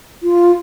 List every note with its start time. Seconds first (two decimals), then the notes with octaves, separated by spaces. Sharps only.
0.23 F4